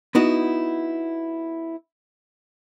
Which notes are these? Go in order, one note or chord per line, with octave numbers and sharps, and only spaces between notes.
B3 D#4 E4 F#4